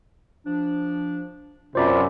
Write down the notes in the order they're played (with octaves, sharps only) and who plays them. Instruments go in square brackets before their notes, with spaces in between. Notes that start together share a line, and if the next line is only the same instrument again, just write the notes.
[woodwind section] F3 D4
[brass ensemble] F#2 C3 [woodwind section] F4 [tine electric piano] C5 D5 B5